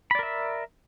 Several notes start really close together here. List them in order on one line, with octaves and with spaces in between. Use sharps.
B5 D5 A#4 E5